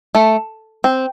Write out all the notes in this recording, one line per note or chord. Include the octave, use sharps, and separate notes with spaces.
A3
C4